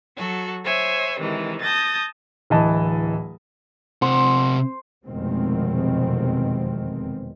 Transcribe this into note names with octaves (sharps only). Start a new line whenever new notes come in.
F#3 F#4 A4
C5 C#5 E5 G#5
C3 D#3 E3 G#3
A5 D#6 G6 A6 A#6
D1 E3 D#5 A5
C3 C5 F#5
F1 E2 B2 D#3 G#3 C4